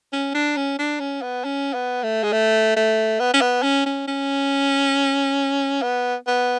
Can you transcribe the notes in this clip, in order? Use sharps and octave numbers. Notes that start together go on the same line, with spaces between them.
C#4
D4
C#4
D4
C#4
B3
C#4
B3
A3
G#3
A3
A3
B3
C#4
B3
C#4
C#4
C#4
B3
B3